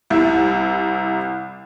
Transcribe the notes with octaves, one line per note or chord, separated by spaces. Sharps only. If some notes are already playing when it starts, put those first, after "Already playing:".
C2 E4